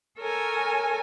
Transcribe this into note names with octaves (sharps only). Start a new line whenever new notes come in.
A4 A#4 C#5 G#5